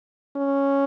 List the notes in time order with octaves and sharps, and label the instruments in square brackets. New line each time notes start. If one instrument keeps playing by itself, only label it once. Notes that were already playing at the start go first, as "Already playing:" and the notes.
[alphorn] C#4